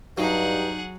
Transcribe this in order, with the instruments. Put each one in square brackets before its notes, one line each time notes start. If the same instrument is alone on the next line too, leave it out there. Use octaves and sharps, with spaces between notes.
[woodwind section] G2 [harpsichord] F#3 [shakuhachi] D#4 [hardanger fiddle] G#4 F#5